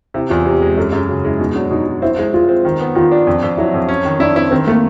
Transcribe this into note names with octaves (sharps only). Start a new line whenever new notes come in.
C3 E4
E2 F4
C3 G4
G#3 G#4
F#2 A4
F#2 G#4
C#3 F#4
G#3 E4
B2 D#4
F#3 D4
B2 D#4
F#3
C4 E4
G#3 E4
G#3 F4
C4
D#3
B3
D#3 F4
D4
F2
F2
F#3 E4
F2
C#4
D#3
D4 E4
C4 E4
D#3 C4
A3 A#3